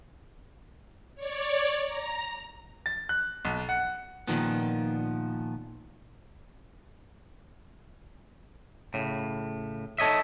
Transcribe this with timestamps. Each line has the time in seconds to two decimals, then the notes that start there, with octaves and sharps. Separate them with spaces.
1.15 C#5 D5
1.85 A#5
2.86 A6
3.09 F#6
3.45 B1
3.69 F#5
4.28 A#2 D#3 F3 B3
8.94 A2 C#3
9.99 D#4 A4 C#5 D#5 E5